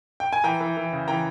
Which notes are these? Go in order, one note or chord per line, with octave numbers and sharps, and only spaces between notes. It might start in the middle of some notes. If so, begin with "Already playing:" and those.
G5
G#5
E3 G5 A#5
E3
E3
C#3
E3 G5 A#5